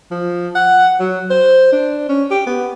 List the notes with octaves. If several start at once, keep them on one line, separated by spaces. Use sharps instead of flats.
F3
F#5
F#3
C5
D4
C#4
G4
B3